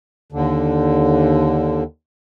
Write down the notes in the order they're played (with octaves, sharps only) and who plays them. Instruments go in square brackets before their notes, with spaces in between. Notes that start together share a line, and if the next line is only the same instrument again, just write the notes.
[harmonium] D#2 D3